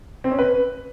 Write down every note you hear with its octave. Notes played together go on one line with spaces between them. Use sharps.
C4
C#4
B4